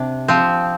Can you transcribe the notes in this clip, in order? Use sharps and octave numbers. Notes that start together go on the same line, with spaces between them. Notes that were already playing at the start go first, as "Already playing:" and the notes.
Already playing: C3 D4
F3 C4